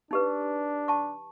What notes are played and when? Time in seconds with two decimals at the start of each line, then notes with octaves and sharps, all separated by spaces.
0.11 D4 D#4 G4 B4
0.88 A5 C#6